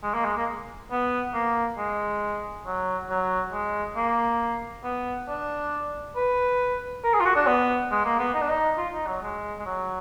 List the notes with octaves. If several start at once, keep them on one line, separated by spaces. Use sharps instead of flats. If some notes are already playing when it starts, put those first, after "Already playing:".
G#3
A#3
G#3
A#3
B3
A#3
G#3
F#3
F#3
G#3
A#3
B3
D4
B4
A#4
G#4
F4
F#4
D4
B3
G#3
A#3
B3
D#4
D4
D#4
F4
D#4
F#3
G#3
G#3
F#3